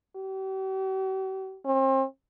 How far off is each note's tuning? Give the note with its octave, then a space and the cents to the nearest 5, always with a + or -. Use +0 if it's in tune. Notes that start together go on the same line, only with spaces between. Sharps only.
G4 -45
C4 +35